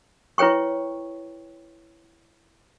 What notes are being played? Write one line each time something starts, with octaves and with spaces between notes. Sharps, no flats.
E4 B4 C#5 G5 C#6